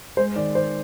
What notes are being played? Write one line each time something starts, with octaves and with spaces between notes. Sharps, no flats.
G#3 C5
D#3 D5
D#3 C5